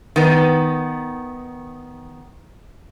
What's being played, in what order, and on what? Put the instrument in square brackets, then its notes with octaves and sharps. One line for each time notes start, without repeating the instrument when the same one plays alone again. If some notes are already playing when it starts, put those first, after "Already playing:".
[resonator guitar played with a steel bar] D#3 B3